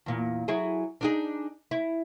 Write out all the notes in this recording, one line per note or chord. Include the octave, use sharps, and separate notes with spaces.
E2 A#2
F#3 E4 G#4
D4 D#4 G#4
E4